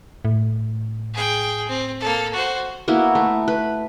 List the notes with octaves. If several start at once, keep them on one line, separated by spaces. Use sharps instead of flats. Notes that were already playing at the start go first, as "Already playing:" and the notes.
A2
G#4 G5
C4
A#3 A4
F#4 C5
A#3 B3 E4 F#4
A3
B4